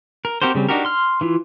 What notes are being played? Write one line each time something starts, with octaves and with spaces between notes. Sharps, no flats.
A#4
C4 F#4 G4 A#4 C5
C#3 G3 C4
D4 D#4 F#4 G4 A#4
C6 F6
E3 E4 F4